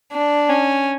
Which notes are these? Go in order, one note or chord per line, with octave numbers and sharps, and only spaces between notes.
D4
C#4